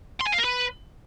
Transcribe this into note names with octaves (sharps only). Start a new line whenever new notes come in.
C6
G#5
F5
A#4
B4